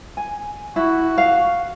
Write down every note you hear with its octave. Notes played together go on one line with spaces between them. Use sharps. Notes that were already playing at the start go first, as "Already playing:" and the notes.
G#5
E4 F#4
F5